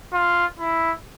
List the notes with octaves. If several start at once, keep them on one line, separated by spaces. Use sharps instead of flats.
F4
E4